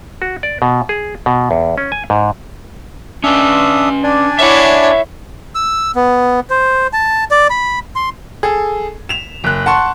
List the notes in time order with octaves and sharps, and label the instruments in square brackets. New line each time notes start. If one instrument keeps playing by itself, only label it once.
[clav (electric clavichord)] F#4
D5
B2
G#4
B2
E2
C#4
G#5
G#2
[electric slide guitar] C#4 B4 [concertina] D4 E5 D#6
[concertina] D4 D5 G#5
[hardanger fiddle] E4 C#5 [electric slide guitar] E5 F#5
[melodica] E6
B3
C5
A5
D5
B5
C6
[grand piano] G#4 A4
E7 F7
F#1 F#6
F#5 A5 C6 C#6